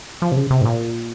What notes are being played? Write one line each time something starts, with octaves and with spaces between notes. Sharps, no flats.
F3
C3
C#3
C3
G#2
A#2